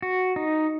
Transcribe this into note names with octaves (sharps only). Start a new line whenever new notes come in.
F#4
D#4